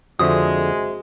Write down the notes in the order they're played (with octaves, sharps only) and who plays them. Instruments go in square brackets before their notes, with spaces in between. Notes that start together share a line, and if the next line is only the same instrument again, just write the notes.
[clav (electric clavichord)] F2 D3 [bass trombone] G#3 [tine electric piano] F#4 C5 E5 [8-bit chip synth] D#6